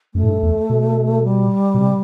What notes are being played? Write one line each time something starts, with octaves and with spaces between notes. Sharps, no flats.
F#2 A3
A2
G2
E2
B2
G3
B2
C3